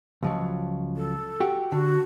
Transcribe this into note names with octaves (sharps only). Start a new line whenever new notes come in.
C#2 F3 F#3
A4
F#4 G4
D3 F#4